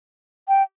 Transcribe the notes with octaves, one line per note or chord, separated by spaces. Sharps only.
G5